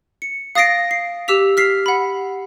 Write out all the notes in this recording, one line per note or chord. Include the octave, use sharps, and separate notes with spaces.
C#7
F5 D#6 A6 A#6 C7 D7
C7
G4 D6 E6 B6 F7
F6 B6 C7
F#5 B5